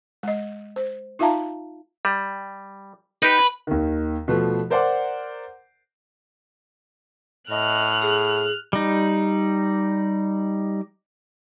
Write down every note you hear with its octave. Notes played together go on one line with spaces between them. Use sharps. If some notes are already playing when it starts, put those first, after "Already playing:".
G#3 D#5
C5
D#4 F4 E5 F5 A5 A#5
G3
D#4 G4 B4
D#2 D#3
B2 F3 A3
A#4 C5 D5 F#5 C6 D6
A2 D#5 F6 F#6
G#4
G3 D#4